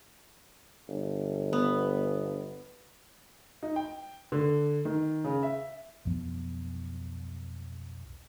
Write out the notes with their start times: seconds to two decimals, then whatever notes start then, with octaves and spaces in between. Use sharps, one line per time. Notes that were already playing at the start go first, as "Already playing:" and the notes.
0.89 G1
1.53 B3
3.63 D#4
3.76 G5
4.32 D3
4.85 D#3
5.24 C#3
5.43 E5
6.05 B1 F2 F3 B3